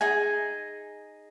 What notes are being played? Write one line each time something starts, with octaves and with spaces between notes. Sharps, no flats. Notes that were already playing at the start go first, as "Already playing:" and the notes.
D#4 G#4 G#5